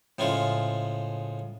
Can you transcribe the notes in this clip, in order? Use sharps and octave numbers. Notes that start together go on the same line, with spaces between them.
A2 C#3 F3 G#3 F4